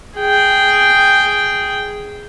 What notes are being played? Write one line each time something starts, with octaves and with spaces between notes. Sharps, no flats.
G#4 G5